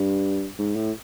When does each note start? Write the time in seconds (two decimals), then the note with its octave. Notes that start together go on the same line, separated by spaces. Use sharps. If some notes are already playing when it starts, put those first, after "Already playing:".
Already playing: G2
0.58 G#2
0.76 A2